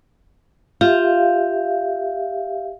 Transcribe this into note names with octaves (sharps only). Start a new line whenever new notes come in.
F4 G4 E5 F5